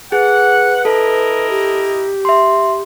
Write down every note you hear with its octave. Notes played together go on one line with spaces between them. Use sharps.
G#4 B4 F#5
E4 A4 A#4 D#5
G4
E5 C6